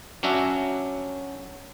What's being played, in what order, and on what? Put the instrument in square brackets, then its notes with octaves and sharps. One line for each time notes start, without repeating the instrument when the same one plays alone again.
[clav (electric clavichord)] F#3 C#4 D4 F#4 E5